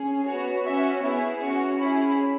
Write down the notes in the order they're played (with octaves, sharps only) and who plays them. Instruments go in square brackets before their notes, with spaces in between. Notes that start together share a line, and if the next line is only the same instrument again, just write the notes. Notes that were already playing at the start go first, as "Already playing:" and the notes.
Already playing: [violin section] C#4 G#4
B3 F#4 C#5
C#4 F#4 E5
B3 E4 G#4 E5
C#4 F#4 C#6
C#4 E4 G#4 B5